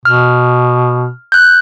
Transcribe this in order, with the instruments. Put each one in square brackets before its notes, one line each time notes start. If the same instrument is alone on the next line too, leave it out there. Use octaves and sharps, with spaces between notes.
[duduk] B2 [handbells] F6
[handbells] F#6 G6